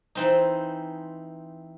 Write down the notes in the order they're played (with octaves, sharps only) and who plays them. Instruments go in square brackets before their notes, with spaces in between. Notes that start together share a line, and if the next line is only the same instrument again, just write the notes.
[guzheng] E3 C4 D#4